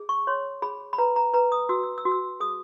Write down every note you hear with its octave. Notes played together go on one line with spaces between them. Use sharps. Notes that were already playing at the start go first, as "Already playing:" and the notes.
Already playing: G#4
C#6
C#5 C6
G#4 B5
B5
B4 A#5
A#5
B4 A#5
D#6
F#4 E6
E6
E6
F#4
E6
G#4 D#6